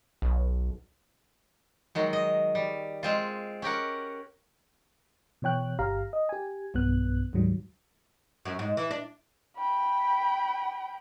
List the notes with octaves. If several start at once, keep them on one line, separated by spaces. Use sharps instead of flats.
B1
D#3 F#3 G#3
D#5
G3
G#3 C4 F4
C#4 G4 A#4 F#5
B2 E3 C#5 G5 F#6
G1 G4 F5 A#5
D#5
G4 G#5
B1 G2 B3 F#6
D2 G#2 D#3 F#3 G3
F#2
G#2
E3
D4
G5 B5